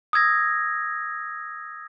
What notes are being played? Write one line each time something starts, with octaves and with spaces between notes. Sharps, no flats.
D#6 E6 G#6 A#6